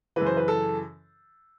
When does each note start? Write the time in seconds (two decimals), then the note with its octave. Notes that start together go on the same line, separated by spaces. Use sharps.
0.16 F#2 C#3 E3 B4
0.26 C5
0.37 B4
0.48 A4